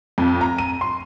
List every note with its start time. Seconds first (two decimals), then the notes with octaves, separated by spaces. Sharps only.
0.18 F2
0.41 A#5
0.58 D#7
0.81 C6